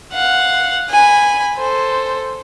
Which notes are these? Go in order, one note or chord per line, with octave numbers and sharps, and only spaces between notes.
F5 F#5
G#5 B5
A4 C5